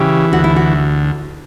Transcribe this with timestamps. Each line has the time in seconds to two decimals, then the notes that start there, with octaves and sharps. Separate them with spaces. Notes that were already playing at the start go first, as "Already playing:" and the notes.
Already playing: C#3 E3 G4
0.32 D2 F#4
0.44 E4
0.56 F#4